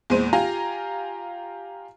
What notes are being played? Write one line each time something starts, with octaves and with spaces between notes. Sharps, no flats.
E2 A#2 G#3 C5 D#7
F4 G4 F5 G#5 A#5